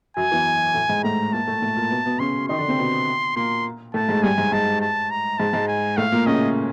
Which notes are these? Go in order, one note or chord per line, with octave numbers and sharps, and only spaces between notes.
F#2 F#3 G#5
E2 E3
A2 A3
G#2 G#3
A2 A3 A#5
A#2 A#3 A5
A2 A3
A2 A3
A#2 A#3
B2 B3
B2 B3
C#3 C#4 C6
D#3 D#4 C6
D3 D4
C3 C4
B2 B3
A#2 A#3 C6
A2 A3 A5
G#2 G#3
G2 G3 G#5
G#2 G#3
G#2 G#3 A5
A5
A#5
G#2 G#3 A5
G#2 G#3
G#5
A2 A3 F5
A#2 A#3
C#3 C#4 D#5